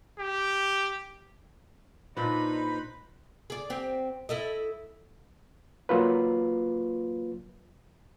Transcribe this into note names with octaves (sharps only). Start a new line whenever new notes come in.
G4
A#2 D4 D#4 B4 C5 B5
G#4 D5
C4 G4
E4 A4 D#5
F#3 A#3 F4 B4